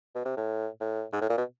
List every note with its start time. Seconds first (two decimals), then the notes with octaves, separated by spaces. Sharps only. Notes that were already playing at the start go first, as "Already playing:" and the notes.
0.15 B2
0.25 C3
0.37 A2
0.80 A2
1.12 G#2
1.21 A2
1.30 A#2
1.38 B2